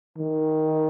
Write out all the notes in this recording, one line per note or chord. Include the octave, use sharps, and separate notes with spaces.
D#3